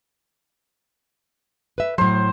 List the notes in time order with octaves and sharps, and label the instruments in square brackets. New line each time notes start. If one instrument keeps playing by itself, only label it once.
[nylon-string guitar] B4 E5
[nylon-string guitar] A2 F#3 [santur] C5